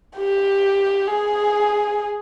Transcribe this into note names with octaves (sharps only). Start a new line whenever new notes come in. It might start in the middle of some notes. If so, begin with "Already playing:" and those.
G4
G#4